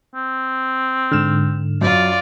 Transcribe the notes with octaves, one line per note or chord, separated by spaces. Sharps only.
C4
G#2 D3 F6 E7
F#2 F4 D5